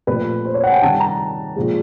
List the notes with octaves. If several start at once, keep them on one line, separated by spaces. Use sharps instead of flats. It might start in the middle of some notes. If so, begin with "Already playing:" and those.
A#2 F3 A3 C4 B4
C5
C#5
F#5
G#5
G5
C3 D#3 G3 A5
A#5
A#2 F3 G#3